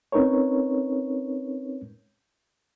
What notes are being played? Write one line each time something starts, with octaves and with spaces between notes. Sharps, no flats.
C4 C#4 D#4 A#4 B4 C#5